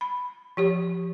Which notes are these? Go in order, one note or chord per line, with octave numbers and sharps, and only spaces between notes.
B5
F3 G4 C#5